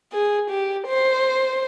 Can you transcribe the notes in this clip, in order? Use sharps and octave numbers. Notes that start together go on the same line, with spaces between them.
G#4
G4
C5